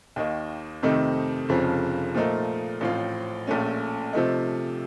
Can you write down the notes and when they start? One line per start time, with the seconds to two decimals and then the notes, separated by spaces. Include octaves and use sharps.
0.16 D#2 D#3 A#3 D#4
0.83 F2 C3 D#3 A3 D#4
1.49 F1 F2 C#3 F3
2.14 A#2 F3 A3 D#4 A#4
2.81 A1 A2 F3 C4 F4
3.47 A#1 A#2 A3 C#4
4.13 C3 F3 A3 D#4